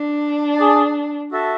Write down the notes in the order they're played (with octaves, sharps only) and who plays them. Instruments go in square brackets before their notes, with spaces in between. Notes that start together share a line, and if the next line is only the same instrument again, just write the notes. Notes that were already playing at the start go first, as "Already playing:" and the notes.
Already playing: [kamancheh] D4
[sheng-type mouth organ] G#4 D5 A5
F#4 A4 E5 A5